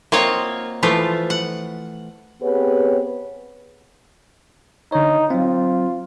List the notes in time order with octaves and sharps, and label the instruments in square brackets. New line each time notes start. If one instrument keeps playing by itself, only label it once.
[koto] A#3 C4 F4 F#4 C#5 D#5
E3 F3 A3 F4
F#5
[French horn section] B3 C4 G4 G#4 B4 C#5
[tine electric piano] D3 C#5 [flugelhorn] D#4
[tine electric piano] F#3 C4 [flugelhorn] F4